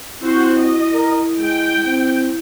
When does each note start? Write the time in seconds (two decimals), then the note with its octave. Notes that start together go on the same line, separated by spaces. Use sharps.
0.21 C4 E4 F#4 C5
0.56 D#5
0.93 A#4
1.39 G#3 G5
1.85 C4